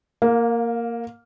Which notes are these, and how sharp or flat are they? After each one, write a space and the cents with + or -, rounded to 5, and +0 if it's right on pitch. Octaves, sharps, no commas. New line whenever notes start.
A#3 -5 F5 +25